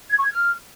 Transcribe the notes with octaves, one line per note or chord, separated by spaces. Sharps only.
G#6
C#6
G#6
F6